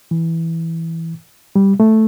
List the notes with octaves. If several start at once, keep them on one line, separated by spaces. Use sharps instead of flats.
E3
G3
A3